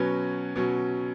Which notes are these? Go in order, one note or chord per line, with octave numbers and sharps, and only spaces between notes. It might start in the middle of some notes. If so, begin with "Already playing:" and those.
Already playing: B2 F#3 C#4 B4
B2 F#3 C#4